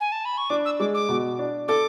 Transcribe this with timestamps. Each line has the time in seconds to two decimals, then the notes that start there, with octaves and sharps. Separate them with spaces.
0.00 G#5
0.12 A5
0.25 B5
0.38 C#6
0.50 D4 D6
0.65 E6
0.80 G#3 D6
0.95 D6
1.09 B2
1.39 D4
1.68 A4 D6